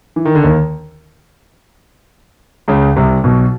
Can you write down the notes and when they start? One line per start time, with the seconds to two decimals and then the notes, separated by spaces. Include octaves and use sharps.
0.16 E3
0.25 D#3
0.35 D3
0.43 D#2 D#3
2.68 C#2 C#3
2.96 C2 C3
3.24 B1 B2